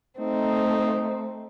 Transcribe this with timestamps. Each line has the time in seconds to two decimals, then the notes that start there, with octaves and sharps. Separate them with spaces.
0.20 A3 C4 D#4